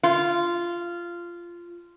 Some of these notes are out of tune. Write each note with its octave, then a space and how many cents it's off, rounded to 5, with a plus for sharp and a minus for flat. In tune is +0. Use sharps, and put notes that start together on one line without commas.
F4 -15